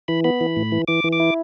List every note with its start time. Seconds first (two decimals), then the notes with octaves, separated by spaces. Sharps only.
0.08 E3 B5
0.24 B3 B5
0.41 E3
0.57 A2
0.72 E3
0.88 E3 D6
1.04 E3
1.12 D6
1.20 E4